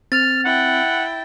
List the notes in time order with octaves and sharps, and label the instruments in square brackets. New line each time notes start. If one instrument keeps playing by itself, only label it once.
[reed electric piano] C4 [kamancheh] F6 [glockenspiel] A6
[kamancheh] E4 G5 [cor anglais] F#5